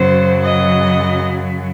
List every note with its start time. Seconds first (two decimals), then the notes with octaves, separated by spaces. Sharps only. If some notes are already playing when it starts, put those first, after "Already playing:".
Already playing: F#2 C#3 F#3 C5
0.44 D#5